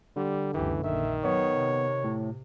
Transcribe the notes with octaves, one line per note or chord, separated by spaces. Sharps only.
D3 G3
F#1 C#2 E3 G4
A#1 D#3 E5
F#3 B3 C#5
C3
A2